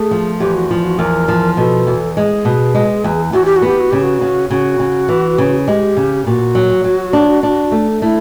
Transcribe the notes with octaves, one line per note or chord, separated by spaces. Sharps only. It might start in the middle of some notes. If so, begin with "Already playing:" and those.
Already playing: A3 G#4
F3
E2 G4
F#4
F3 F4
F#4
E2 A#4
F3
B2 A4
E2
G#3 G#4
B2
G#3
E2
E2 F#4
G4
F#4
B3
G4
F#4
C#3 G4
F#4
C#3
C#3 F#4
C#3
E3
C#3
G#3 G4
C#3
A#2 F#4
F#3
F#3
D4
D4
A3
A3 E4